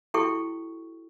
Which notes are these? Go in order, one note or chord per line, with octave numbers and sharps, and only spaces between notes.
E4 F#4 G4 A4 G5 C#6